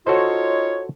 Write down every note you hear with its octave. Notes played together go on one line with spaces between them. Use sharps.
D#4 F4 F#4 A4 C5 C#5